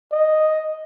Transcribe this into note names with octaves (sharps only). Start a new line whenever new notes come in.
D#5